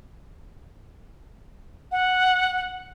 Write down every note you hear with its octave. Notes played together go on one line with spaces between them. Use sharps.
F#5